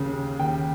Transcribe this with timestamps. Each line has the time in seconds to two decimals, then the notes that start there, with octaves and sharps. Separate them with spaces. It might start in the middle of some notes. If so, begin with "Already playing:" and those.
Already playing: D#2 C#3
0.39 D#2 G5